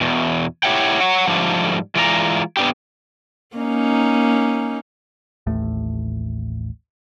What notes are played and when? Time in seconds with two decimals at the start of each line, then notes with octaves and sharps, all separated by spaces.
0.01 E2 B2
0.63 E4 G4 C#5 E5 F#5 G5
1.00 C#5 F#5
1.27 G#2 D3 F3 G3 A3
1.96 E3 G#3 F4 D5 D#5 A#5
2.57 B3 D4 G4
3.56 A#3 C#4 D#4
5.47 A1 D#2 A2 A3